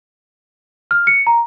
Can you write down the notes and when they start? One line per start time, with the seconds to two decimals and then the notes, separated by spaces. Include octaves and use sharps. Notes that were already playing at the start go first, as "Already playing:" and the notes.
0.91 F6
1.07 C#7
1.27 A#5